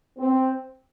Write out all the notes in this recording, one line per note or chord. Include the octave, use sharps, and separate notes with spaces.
C4